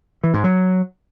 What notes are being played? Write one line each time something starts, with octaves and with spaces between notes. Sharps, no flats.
E3
G#2
F#3